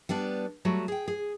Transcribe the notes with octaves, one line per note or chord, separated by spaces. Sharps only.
G3 B3 D4 D5
F#3 G3 A3 F#4
G#4 G5
G#4